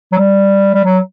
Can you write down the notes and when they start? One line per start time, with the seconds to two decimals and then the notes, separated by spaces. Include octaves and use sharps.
0.12 F#3
0.18 G3
0.74 G3
0.84 F#3